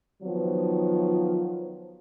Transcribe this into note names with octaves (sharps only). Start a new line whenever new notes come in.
D#3 F3 F#3 B3